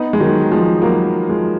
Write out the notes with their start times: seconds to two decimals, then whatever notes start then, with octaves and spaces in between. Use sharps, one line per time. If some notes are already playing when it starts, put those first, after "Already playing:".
Already playing: B3 D#4
0.13 G#3
0.20 D#3 F#3
0.52 F3 G#3
0.82 F#3 A#3
1.29 F3 G#3